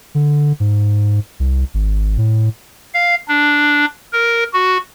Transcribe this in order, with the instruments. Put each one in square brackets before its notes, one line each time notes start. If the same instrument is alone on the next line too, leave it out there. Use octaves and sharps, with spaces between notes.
[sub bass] D3
G#2
C2
G#1
A2
[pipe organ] F5
D4
A#4
F#4